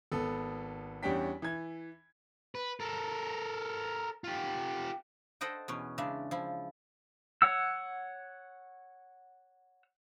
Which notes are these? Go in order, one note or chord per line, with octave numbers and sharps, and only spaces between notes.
G#1 B3 A4
E2 G3 C#4 D4 G5 B6
E3 G#6
B4
A4 A#4
F4 G4
A4 C5 D#5 F#5 G5
E2 B2 C#4
C#3 G#3 D4 E5
F3 E4
C#5 F#5 E6